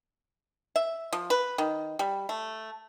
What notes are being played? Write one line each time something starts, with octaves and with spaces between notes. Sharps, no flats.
E5
F3
B4
D#3
G3
A3